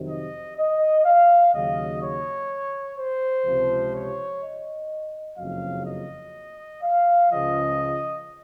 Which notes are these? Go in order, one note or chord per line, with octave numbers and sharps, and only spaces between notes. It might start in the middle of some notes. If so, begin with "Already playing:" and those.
Already playing: F2 C3 D#3 F#3
D#5
D#5
F5
D#2 C#3 F#3 D#5
C#5
C5
C#2 C3 F3
C#5
D#5
F#1 F2 C#3 F#3 F5
D#5
F5
C#2 C#3 F3 D#5